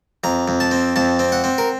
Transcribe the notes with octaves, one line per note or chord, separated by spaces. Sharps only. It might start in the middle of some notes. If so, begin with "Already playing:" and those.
F2 A#5
F2
A5
C4
F2 A5
C4
F#5
C4
A#4